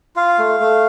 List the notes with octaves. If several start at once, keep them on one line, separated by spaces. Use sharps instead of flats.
F4 F5
A3
A3